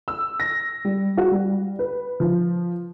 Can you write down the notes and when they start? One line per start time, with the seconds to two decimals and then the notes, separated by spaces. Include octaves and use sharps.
0.08 E6
0.40 A#6
0.85 G3
1.17 F#4
1.32 G3
1.79 B4
2.20 F3